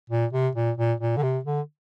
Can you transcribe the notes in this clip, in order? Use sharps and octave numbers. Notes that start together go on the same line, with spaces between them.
A#2
C3
A#2
A#2
A#2
D3
C3
D3